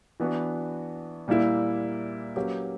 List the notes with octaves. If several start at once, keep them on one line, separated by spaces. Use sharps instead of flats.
E3 B3 D4 F#4
A#2 G3 A#3 E4
F#3 A#3 C#4 G4 B4